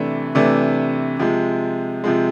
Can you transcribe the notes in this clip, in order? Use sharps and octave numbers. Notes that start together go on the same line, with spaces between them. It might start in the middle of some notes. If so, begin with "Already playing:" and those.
Already playing: C3 E3 A3 D4
C3 E3 A3 D4
C3 F3 G#3
C3 F3 G#3